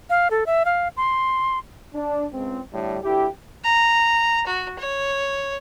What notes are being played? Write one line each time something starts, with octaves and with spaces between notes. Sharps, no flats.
F5
A4
E5
F5
C6
D4
C#2 C4
A2 D3 G3 A3
D2 E4 G4
A#5
F#4
C#5